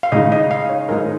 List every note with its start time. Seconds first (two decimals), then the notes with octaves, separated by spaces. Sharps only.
0.03 F5
0.12 C#3 G#3 D#4 D#5
0.32 D#5
0.51 F5
0.69 C#5
0.89 G#2 G#3 D#4 A#4